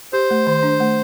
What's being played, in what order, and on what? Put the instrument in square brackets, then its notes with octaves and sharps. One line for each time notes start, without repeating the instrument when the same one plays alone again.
[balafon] G4 [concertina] C5
[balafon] A3
D#3
D4
A3